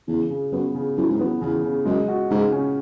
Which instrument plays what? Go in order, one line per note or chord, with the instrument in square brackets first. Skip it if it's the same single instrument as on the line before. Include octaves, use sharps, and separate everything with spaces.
[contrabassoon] E2 [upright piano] C#3
[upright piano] C#3
[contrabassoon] F#2 [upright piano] B3
[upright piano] C#3
[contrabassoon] F#2 [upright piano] E3
[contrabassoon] G#2
[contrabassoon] F#2 [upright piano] B3
[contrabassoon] E2 [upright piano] C#3
[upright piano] C#3
[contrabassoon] F#2 [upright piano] G#3
[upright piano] F#4
[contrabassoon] G#2 [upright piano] C#3
[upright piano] C#4